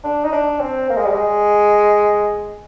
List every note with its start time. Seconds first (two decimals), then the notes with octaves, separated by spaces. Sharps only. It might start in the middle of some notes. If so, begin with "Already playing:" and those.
0.04 D4
0.24 D#4
0.32 D4
0.61 C4
0.90 A#3
0.97 G#3
1.06 G3
1.14 G#3